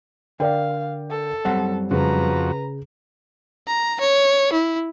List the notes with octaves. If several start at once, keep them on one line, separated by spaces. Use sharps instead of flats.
D3 A#4 D5 F5 G5
A4
F#2 G3 C4 F#5
F2 C#3 F#4 B4 A#5
A#5
C#5
E4